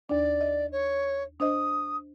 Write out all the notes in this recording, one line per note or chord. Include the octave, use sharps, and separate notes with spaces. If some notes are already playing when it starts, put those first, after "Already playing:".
D#2 D4 D5
D#5
C#5
D4 C5 D#5 D#6